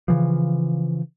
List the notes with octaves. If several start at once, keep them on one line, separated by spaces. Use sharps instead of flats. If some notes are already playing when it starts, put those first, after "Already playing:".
C#3 E3 F3